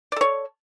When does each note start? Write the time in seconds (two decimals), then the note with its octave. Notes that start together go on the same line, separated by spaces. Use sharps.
0.12 D5
0.16 A4
0.21 C#5